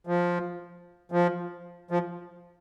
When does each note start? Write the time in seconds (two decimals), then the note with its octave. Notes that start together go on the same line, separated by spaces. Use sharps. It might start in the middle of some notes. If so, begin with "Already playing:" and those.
0.07 F3
1.12 F3
1.91 F3